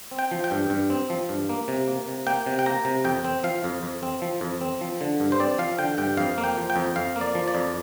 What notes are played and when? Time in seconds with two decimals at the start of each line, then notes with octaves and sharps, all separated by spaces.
0.11 C4
0.19 G5
0.31 F3
0.44 G5
0.51 G2
0.70 G2
0.90 C4
1.10 F3
1.29 G2
1.49 A#3
1.68 C3
1.88 A#3
2.08 C3
2.27 A#3 G5
2.46 C3
2.59 G5
2.66 A#3 A#5
2.85 C3
3.04 F2 G5
3.25 C4
3.44 F3 F5
3.64 F2
3.83 F2
4.03 C4
4.22 F3
4.41 F2
4.61 C4
4.81 F3
5.01 D3
5.20 G2
5.32 C5
5.39 C4 D5
5.58 F3 F5
5.79 D3 G5
5.98 G2 G5
6.17 F2 F5
6.38 A#3
6.44 G5
6.57 F3
6.70 G5
6.76 F2
6.96 F2 F5
7.16 A#3
7.21 D5
7.35 F3
7.48 D5
7.55 F2